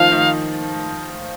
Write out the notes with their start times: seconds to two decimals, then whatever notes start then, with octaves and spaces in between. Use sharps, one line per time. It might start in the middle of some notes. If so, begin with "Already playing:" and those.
Already playing: D#3 F3 D#4 F4 F5
0.12 D#3 D#4